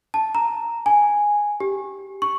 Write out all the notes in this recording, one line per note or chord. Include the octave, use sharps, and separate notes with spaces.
A5
A#5
G#5
G4
C#6